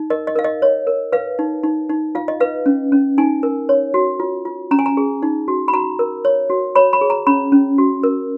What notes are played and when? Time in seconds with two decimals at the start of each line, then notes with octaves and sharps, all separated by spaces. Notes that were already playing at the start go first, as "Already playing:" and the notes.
Already playing: D#4
0.10 A#4 D#5
0.27 D#5
0.36 A#4 F5
0.44 D#5
0.62 C#5
0.87 A#4
1.12 B4 F5
1.39 D#4
1.63 D#4
1.90 D#4
2.15 F4 F5
2.28 D#5
2.40 B4 F5
2.66 C#4
2.92 C#4
3.18 D#4 G#5
3.43 A#4
3.69 C#5
3.94 F#4
4.20 F4
4.45 F4
4.71 C#4 A#5
4.79 G#5
4.86 A#5
4.97 G#4
5.23 D#4
5.48 F#4
5.68 B5
5.73 F#4 A#5
5.99 A#4
6.25 C#5
6.50 F#4
6.75 C#5 B5
6.93 B5
7.01 G#4
7.10 A#5
7.27 C#4 B5
7.52 C#4
7.78 F#4
8.03 A#4